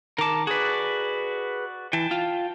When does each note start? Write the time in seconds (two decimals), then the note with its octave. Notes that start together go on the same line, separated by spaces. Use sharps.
0.18 D#3 A#4 A5 D6
0.47 F#4 G#4 B4 D5
1.93 E3 G5 A5
2.11 F4